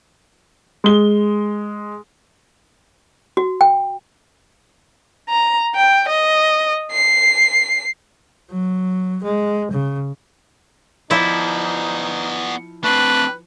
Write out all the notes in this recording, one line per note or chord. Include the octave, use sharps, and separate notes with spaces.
G#3 G7
F#4
G5
A#5
G5
D#5
C7
F#3
G#3
C#3
F3 B3 D#4 E4 D5
A3 C4 D4 B4